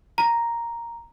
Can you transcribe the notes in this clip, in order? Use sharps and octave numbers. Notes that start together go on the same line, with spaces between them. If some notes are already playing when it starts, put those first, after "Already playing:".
A#5